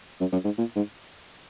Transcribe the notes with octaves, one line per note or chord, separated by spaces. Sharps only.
F#2
F#2
G#2
A#2
G#2